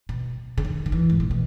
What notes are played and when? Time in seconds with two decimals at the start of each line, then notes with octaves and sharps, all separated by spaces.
0.09 B2
0.58 C#3
0.65 D#3
0.86 D#3
0.92 E3
1.10 G#2
1.20 A#2
1.31 B2